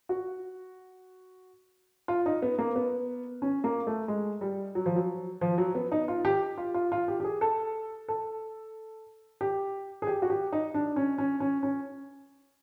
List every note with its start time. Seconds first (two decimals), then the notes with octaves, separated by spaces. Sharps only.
0.09 F#4
2.08 F4
2.26 D#4
2.42 B3
2.59 A#3
2.76 B3
3.42 C#4
3.64 A#3
3.87 A3
4.08 G#3
4.41 G3
4.75 F#3
4.86 F3
4.96 F#3
5.41 F3
5.58 F#3
5.75 B3
5.92 D#4
6.08 F4
6.25 G4
6.58 F4
6.74 F4
6.92 F4
7.08 G4
7.20 G4
7.24 G#4
7.41 A4
8.08 A4
9.41 G4
10.02 G#4
10.07 G4
10.22 F#4
10.30 G4
10.53 D#4
10.74 D4
10.96 C#4
11.18 C#4
11.40 C#4
11.63 C#4